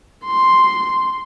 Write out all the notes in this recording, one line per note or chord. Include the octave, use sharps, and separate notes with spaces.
C6